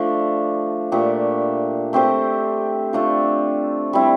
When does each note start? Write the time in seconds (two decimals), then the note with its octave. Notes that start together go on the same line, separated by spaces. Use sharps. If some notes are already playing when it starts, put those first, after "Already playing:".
Already playing: F3 A3 D4
0.92 A#2 A3 D4 G4
1.93 A3 C4 G4 C5
2.93 A3 D4 F4
3.93 G3 C4 E4